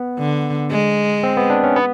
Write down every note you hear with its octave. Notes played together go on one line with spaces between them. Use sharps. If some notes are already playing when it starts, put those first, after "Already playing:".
Already playing: B3
D3
G#3
C4
B3
D4
C#4
B3